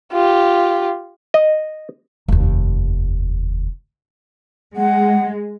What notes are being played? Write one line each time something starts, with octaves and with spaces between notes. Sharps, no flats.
F4 G4
D#5
F1 D#2
G#3 F#5